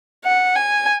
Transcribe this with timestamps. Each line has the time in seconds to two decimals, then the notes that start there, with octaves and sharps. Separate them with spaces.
0.25 F#5
0.56 G#5